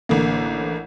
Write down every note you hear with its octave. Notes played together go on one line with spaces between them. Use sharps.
A1 D3 A#3